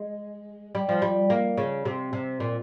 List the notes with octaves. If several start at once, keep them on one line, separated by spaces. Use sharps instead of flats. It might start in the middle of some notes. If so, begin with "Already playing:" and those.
Already playing: G#3
G3
F3
G3
A#3
C#3
C3
C3
A#2